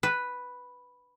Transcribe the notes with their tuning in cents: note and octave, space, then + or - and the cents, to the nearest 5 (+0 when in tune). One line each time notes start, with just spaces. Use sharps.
B4 +0